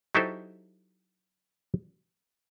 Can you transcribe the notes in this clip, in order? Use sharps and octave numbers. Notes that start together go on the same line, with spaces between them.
F#3 D#4 E4 G4 A4 C5